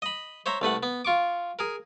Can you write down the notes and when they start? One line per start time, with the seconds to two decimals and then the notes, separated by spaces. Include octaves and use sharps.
0.02 D#5 B5
0.46 C5 C#5 E5 A#5
0.62 C2 A3 B4 F#5
0.83 B3
1.05 F4 C#6 D6
1.59 G#4 A#4